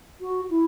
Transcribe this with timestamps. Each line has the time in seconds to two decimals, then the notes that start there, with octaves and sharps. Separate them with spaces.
0.21 F#4
0.50 E4